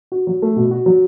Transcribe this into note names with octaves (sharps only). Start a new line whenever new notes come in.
F#4
F#3
A3
B2
F#4
F#3